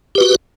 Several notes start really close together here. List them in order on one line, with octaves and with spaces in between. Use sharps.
G4 B4 F#4